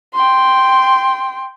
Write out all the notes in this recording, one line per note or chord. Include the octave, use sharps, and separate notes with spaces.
G5 C6